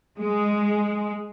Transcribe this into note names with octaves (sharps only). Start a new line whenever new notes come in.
G#3